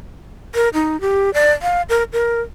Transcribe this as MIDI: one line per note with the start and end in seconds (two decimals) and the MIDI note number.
0.55 0.69 70
0.74 1.00 63
1.01 1.33 67
1.34 1.51 74
1.62 1.82 77
1.89 2.03 70
2.13 2.41 70